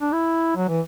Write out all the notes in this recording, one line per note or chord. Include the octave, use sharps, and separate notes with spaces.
D4
E4
F#3
E3